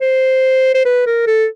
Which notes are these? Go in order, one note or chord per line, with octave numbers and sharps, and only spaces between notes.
C5
C5
B4
A#4
A4